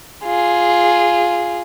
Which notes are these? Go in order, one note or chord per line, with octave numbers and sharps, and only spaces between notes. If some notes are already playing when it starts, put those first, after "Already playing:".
F4 G#4